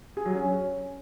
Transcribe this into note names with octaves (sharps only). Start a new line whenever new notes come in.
G#4
F#3
C#4